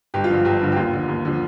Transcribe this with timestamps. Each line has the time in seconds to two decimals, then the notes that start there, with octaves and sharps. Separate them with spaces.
0.14 G1 G4
0.24 F4
0.30 G2 D3 F3
0.45 G1 G4
0.61 G2 D3 F3
0.72 G4
0.77 D#2 F4
0.93 D3 F3
1.09 D#2
1.25 D3 F3